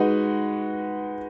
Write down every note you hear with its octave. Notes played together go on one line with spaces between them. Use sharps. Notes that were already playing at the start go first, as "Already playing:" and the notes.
Already playing: G#3 D#4 F#4 B4